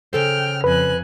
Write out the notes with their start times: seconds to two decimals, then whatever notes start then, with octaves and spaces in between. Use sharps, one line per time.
0.13 C#3 A4 C5 G5 F6
0.64 F2 B4 G#5 F#6